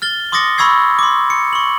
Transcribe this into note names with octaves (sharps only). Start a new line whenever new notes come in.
F6 A6 G7
C6 D6 D#6 A6 A#6 C#7
B5 C#6 E6 G#6 C7
C6 D6
C#7
C#6 F#7